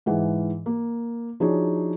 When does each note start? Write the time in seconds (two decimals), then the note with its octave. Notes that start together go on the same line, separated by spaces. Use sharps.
0.06 G#2 E3 G#4 F#5
0.66 A#3
1.40 F3 D4 D#4 F#4 G#4 C#5